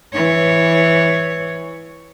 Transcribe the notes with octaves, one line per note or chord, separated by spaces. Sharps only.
E3 C#5